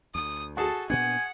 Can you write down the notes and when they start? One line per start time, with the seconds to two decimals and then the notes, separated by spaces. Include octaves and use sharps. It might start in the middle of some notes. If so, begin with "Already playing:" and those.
0.15 D2 D#6
0.57 F#4 G#4 A4 A5
0.90 A#2 B3 D4 F#5 G#5